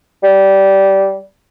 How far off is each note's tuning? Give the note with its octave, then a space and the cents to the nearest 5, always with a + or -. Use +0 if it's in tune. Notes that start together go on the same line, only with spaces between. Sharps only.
G3 -15